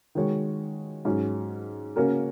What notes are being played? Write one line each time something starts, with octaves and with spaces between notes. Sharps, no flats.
D#3 G#3 F#4 C#5
G#2 F#3 C#4
C#3 A#3 C#4 F#4 A#4